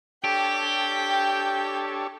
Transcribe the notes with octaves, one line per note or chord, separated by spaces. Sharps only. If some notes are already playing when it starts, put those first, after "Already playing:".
D4 G4 A4 C#5 G5